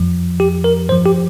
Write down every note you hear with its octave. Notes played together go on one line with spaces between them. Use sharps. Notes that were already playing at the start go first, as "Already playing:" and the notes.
Already playing: F2 F3
G4
A#4
G2 F3 C5
G4